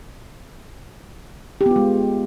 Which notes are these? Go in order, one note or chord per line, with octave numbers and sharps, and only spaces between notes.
G4
B3
F4
G#3